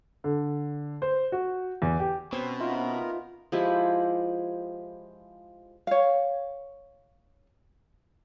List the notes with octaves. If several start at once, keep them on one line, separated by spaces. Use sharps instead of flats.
D3
C5
F#4
E2
G4
B2 C4 C#4 B4 C5
B3 D#4 F4 A#4 E5
F3 G#3 E4 G4
C#5 F5